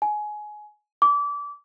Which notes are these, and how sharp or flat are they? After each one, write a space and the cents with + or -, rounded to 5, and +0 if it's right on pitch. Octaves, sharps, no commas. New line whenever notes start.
G#5 +20
D6 -25